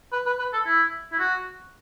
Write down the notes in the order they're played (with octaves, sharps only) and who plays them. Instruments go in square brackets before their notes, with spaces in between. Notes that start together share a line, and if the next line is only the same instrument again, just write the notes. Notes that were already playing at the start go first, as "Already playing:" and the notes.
[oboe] B4
B4
B4
A4
E4
E4
F#4